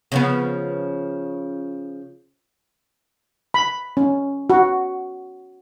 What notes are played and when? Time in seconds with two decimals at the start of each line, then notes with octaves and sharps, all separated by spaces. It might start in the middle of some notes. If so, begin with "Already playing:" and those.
0.12 C#3 F3 B3
3.54 B5
3.97 C#4
4.50 F#4